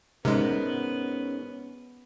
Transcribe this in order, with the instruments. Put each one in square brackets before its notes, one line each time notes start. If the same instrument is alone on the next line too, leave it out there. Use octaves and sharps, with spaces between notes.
[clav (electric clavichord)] G#2 A#4 [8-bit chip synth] C3 G#3 [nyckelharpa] B3 [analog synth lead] C#4